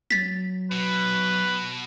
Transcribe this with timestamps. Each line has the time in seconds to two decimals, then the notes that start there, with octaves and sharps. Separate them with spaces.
0.11 F#3 A6 B6
0.72 B2 B4